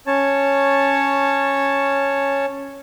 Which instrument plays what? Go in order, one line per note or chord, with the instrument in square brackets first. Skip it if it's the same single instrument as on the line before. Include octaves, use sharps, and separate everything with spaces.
[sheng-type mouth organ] C#4 C#5 A5